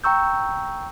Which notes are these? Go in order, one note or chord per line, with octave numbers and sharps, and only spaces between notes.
G5 A#5 C#6 E6 G6